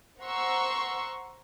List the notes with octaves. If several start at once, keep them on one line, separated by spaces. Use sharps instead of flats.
C5 F#5 A#5 C6 C#6 E6